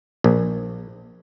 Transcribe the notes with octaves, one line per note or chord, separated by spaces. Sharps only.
A#1